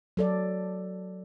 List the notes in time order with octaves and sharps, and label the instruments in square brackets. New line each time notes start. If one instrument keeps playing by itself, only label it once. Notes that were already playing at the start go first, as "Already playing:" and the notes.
[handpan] F#3 A4 D5